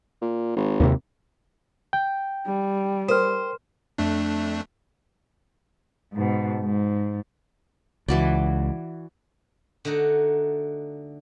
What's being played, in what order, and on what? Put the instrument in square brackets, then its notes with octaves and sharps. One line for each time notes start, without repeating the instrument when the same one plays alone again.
[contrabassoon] A#2
G#1
[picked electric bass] D#2 C3
[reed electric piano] G5
[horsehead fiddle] G3
[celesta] A#4 F6 [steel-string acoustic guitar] C5
[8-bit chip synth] F2 A3 D4
[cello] G#2 B2
G#2
[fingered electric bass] C#2 [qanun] E3 F#4 D5
[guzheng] D3 A3 D#4 F#4